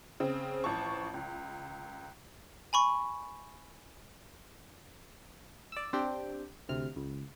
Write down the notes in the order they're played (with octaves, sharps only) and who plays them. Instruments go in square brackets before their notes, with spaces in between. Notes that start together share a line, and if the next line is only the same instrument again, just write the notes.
[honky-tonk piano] C#3 C4
A1 F3 A5 C#6
C#2
[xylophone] G#5 B5 C#6
[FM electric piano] D5 E6
C4 D4 G4 G5
D2 C3 F6
C#2